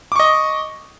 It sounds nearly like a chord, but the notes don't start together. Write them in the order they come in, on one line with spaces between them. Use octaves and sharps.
D6 C#6 D#5